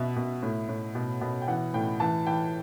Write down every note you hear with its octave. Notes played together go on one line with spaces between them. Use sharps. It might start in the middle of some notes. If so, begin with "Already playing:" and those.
Already playing: B2 E5
B2
A2
A2
B2
B2
G5
E3 F#5
A2 G5
E3 A5
E3 G5